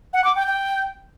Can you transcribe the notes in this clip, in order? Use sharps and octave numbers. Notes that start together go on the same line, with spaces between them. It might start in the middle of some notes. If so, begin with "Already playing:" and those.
F#5
D6
G5
G5